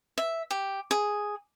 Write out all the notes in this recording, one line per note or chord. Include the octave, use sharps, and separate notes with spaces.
E5
G4
G#4